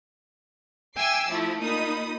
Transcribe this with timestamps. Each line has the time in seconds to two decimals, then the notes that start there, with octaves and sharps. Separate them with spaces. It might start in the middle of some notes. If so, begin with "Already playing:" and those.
0.97 E5 G5 G#5 D6 E6 C7
1.29 F3 A3 E4
1.61 A#2 D#4 B5 D#6